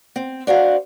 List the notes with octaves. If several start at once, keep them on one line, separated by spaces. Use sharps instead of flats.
C4
D4 F#4 C5 F5